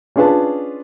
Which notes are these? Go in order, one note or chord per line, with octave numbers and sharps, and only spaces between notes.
C#4 D4 F4 G#4 B4 A5